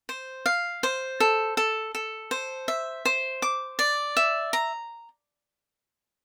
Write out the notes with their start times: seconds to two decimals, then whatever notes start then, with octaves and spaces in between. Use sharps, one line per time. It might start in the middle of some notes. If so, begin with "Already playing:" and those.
0.09 C5
0.46 F5
0.83 C5
1.20 A4
1.57 A4
1.95 A4
2.31 C5
2.68 E5
3.05 C5
3.42 D6
3.79 D5
4.17 E5
4.53 A#5